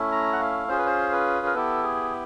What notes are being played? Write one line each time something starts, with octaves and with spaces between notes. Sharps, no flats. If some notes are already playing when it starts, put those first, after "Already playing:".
Already playing: A3 C#4 E4
A#5
F#5
F5
C#4 F4 G#4 C5
B4
C5
B4
A#4
B3 E4 G4 A4
G#4